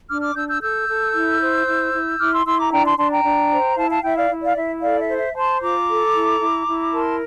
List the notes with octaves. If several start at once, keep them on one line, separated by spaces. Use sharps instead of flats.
D4 D6 F6
D6 F6
D4 E6 G6
E6 G6
A4 E6 G6
A4
E4
C5
E4
E4
E4 D6 F6
C6 E6
E4 C6 E6
A#5 D6
D4 G5 A#5
A5 C6
D4 A5 C6
G5 A#5
D4
C5
E4 F5 A5
F5 A5
E4 E5 G5
D5 F5
E4
D5 F5
E4 E5
A4 D5 F5
E5
C5
E5
C5 A5 C6
F4 A#5 D6
A4
E4
E4
E4
A#4 A5 C6